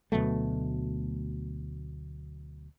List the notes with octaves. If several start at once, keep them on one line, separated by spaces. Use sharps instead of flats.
D2 B2 F#3 A3